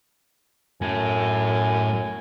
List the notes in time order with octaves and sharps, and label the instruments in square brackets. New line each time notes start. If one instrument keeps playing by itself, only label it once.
[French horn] F#2 [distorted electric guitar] A2 A3 [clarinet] G#5